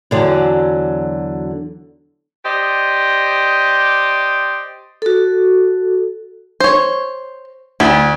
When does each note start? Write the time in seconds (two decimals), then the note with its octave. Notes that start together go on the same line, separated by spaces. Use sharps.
0.11 E2 D3 F#3
2.45 G4 C5 D5 D#5
5.02 F#4 A4
6.60 C5 C#5
7.80 D2 E4